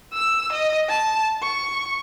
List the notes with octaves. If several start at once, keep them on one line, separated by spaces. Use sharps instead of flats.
E6
D#5
A5
C#6